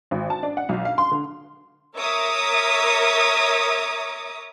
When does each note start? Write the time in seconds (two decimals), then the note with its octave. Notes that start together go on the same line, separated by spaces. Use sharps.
0.11 G#1
0.30 A5
0.43 D4
0.57 F#5
0.69 B1
0.85 F5
0.98 C6
1.11 D3
1.97 A#4 C#5 E5 A#5 D6 D#6